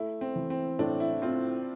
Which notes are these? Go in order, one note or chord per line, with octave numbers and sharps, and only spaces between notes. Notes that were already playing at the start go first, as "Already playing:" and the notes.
Already playing: A3 E4
C4
E3
C4
A2 D4
E4
C4 F4